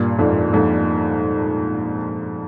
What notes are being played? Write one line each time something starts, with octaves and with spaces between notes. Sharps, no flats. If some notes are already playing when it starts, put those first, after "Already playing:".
Already playing: G2 A#2
F2 G#2
F2 G#2